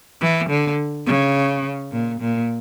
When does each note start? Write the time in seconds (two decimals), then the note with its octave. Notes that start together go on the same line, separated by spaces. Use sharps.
0.21 E3
0.50 D3
1.06 C#3
1.92 A#2
2.21 A#2